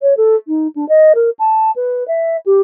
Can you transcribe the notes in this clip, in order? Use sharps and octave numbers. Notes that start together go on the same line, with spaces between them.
C#5
A4
D#4
D4
D#5
A#4
A5
B4
E5
G4